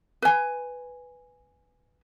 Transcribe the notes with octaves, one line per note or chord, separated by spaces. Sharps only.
B4 G#5